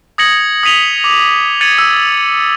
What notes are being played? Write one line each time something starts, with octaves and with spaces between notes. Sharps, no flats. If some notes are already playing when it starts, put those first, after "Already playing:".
D#6 G#6 A#6 C#7 F#7
D#6 A#6 B6 D#7 F7 G7
D6
G#6 A6 C#7 D#7 F#7
E6